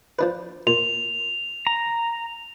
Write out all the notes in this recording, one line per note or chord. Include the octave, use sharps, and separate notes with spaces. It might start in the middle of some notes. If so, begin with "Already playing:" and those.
F3 D4 B4
A#2 F7
A#5